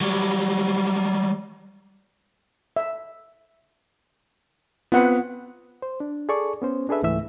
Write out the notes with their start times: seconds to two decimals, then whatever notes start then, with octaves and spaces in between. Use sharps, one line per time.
0.01 F#3 G3
2.77 E5
4.92 B3 C4 F4 B4 F#5 D#6
5.82 C5
6.00 D4
6.29 G#4 A4 D5 C#6
6.62 B3 C#4 C5
6.89 D4 G#4 A4 B4 E5
7.02 C#2 G#2 E3 A3 E5 E6